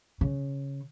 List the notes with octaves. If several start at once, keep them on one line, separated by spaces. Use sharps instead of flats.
C#3